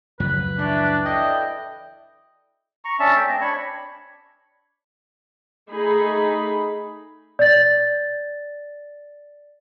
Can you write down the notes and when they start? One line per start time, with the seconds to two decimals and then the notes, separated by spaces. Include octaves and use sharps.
0.20 C#2 F#2 F3 B4
0.59 E3 D4 F#4 F5
1.05 D4 E4 A4 D#5 G5
2.85 A#5 C#6
2.99 C#4 D4 E5 A5
3.16 A3 G5
3.28 C4 D#5
3.41 D4 C#5 B5 C#6
5.70 A3 D#4 G#4 B5
7.39 D5 A6